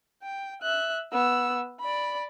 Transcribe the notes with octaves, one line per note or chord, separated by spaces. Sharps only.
G5
E5 F#6
B3 E6
D5 B5